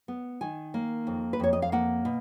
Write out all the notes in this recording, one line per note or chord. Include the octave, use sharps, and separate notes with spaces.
B3
D#3 G#5
A#3
F2
B4
F2 C#5
D#5
F5
A#3 F#5
B2